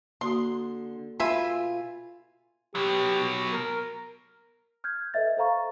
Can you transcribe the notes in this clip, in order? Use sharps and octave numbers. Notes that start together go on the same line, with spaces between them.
D3 A#3 F#4 C6 D#6
B2 F4 E5 G#5 B5 C6
B2 F#3 G4
A#4
F6 G6 G#6
A4 B4 D#5 E5 A6
A4 C5 F5 A#5 C#6